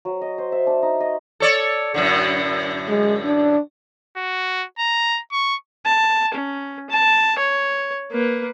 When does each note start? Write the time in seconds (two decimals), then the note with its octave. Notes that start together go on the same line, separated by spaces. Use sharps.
0.05 F#3
0.21 D#5
0.38 C5
0.52 E5
0.67 D4
0.82 D#4
1.00 D#5
1.40 A4 C#5 D5
1.94 F#2 A2 D3
2.88 G#3
3.25 D4
4.17 F#4
4.79 A#5
5.32 C#6
5.86 A5
6.34 C#4
6.90 A5
7.39 C#5
8.11 A#3 B4